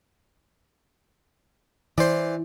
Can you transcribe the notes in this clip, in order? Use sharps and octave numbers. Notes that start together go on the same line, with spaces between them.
E3 C5 D5